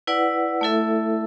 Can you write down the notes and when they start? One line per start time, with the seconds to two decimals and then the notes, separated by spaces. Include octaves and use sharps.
0.07 E4 B4 D5 F#5
0.61 A3 E4 A4 E5